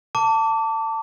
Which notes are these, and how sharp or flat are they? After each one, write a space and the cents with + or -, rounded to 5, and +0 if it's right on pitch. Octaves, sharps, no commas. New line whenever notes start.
A5 +25 D6 -25